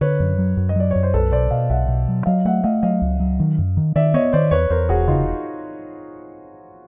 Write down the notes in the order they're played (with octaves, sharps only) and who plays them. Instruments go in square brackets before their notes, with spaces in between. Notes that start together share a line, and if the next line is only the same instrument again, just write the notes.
[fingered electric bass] D3 [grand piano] B4 C#5
[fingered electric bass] F#2
F#3
F#2
[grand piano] D#5
[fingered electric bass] F#3 [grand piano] D5
[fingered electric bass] F#2 [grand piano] C#5
[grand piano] C5
[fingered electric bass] B1 [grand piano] A4 B4
[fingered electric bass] B2 [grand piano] C5 D5
[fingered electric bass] B2 [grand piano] D#5 F5
[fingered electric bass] B1 [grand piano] E5 F#5
[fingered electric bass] B2
F#3
[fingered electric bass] F#3 [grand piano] D#5 F5
[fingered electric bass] A3 [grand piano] E5 F#5
[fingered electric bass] A3 [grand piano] D#5 F5
[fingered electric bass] F#3 [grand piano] D#5 F5
[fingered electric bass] C#2
F#3
D#3
F#2
D#3
[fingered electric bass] D#3 [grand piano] D5 E5
[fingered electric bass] B3 [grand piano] C#5 D#5
[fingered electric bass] D#3 [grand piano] C5 D5
[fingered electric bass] E2 [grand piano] B4 C#5
[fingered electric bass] E2 [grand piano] A#4 C5
[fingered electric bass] E1 [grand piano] F#4 G#4
[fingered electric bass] C#3 [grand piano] D#4 F4